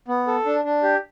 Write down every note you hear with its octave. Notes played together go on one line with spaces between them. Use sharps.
B3
A4
D4
D4
G4